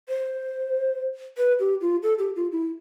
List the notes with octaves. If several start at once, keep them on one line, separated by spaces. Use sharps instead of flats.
C5
B4
G4
F4
A4
G4
F4
E4